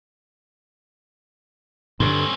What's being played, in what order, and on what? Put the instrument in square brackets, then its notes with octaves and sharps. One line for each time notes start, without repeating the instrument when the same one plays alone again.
[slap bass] G2 D3 [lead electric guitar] C4 C#4